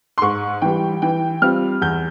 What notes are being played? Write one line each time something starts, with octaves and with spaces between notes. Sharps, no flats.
C6
G#2 C#6
E3 G3 G5
E3 G5
G3 C4 F4 F6
E2 G6